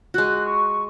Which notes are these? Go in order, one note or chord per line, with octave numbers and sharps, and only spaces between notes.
G#3 F#4 F#6
C#6